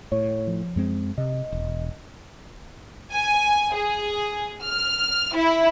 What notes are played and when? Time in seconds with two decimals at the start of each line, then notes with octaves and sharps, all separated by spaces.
0.12 A2 C#5
0.47 F3
0.76 F#2 G#3 C4
1.18 C3 D#5
1.52 E1
3.13 G#5
3.75 G#4
4.63 F6
5.36 E4